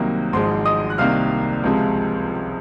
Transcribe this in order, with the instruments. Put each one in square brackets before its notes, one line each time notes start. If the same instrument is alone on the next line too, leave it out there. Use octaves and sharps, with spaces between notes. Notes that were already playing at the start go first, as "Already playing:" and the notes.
Already playing: [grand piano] C2 C3 D#3 F#3 A#3
G#1 G#2 F3 G#3 C5 C6
D#5 D#6
F#6
C2 C3 D#3 A#3 F5 F6
C#2 C3 F3 G#3